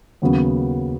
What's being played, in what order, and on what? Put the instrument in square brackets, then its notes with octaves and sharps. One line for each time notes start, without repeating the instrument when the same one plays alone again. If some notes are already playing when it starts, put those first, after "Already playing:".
[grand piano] D#2 C#3 F#3 B3